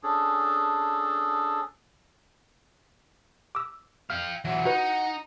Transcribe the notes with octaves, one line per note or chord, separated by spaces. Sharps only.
C#4 D4 G#4 A4
D6 E6
F5 G5 F6
E3 F#3 F#5
D#4 F#4 B4